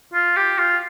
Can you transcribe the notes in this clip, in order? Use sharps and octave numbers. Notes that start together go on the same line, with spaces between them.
F4
G4
F4